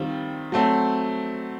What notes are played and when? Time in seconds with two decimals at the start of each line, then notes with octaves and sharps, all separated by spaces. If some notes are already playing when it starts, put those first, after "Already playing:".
Already playing: D#3 G3 C4 F4
0.52 F#3 A3 C4